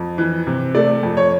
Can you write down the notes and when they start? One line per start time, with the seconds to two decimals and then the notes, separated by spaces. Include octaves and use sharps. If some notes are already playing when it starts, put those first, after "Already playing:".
Already playing: F2
0.18 E3
0.47 C3
0.75 A3 D5
1.03 F2
1.17 C#5